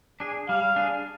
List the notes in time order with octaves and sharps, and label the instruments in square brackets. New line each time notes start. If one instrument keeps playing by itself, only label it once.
[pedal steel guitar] D4 G#4
[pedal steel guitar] G3 [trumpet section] F5
[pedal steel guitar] D4 G#4